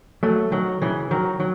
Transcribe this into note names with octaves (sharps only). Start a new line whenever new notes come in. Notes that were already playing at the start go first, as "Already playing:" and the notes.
F#3 A3
D#3 F#3
C#3 E3
D#3 F#3
F#3